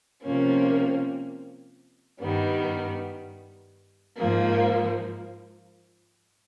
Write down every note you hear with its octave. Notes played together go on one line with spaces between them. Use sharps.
C3 F3 A#3 C#4
G2 D#3 G3 B3
G#2 F3 A#3